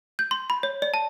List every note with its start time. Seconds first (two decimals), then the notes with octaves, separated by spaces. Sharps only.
0.19 G6
0.31 C6
0.50 B5
0.63 C#5
0.82 D5
0.94 A5